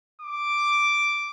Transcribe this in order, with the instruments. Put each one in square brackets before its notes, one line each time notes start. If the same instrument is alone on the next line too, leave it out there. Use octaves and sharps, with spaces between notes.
[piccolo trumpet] D6